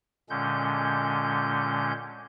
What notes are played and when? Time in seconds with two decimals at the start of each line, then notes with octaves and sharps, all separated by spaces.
0.30 A#2 D3 G#3 C#4 G6